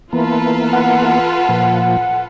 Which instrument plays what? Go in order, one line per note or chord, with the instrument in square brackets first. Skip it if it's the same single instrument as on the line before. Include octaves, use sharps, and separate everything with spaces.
[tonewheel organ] E3 A#3 B3 [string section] F4 A4 B4
[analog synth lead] F#5
[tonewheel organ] A#2 F3